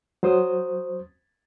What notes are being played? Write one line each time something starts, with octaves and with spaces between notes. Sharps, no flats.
F#3 C5 D#6